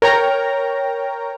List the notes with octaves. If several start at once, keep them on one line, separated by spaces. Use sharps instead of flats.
A#4 C#5 G5 A#5